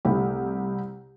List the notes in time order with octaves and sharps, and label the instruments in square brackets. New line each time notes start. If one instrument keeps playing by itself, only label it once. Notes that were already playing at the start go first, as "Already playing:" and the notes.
[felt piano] C2 A3 E4 G4